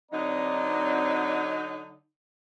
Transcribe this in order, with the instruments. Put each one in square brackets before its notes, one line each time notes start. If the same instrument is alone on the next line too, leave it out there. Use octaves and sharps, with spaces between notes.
[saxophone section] D3 F#3 D#4 [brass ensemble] C4 D5 A#5